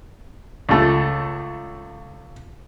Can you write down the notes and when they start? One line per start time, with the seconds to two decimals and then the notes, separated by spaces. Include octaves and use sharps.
0.69 C#2 A3